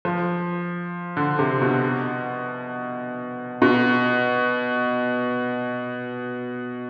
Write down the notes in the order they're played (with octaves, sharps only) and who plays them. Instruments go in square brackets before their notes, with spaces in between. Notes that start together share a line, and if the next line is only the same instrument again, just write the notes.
[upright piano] F3
D3
C3
B2
B2